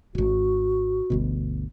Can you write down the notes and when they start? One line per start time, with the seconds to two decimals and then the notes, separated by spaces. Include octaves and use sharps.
0.15 D#1 G#1 F#4
1.10 G1 D2 B2